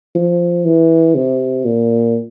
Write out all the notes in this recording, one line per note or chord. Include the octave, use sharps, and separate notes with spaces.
F3
E3
C3
A#2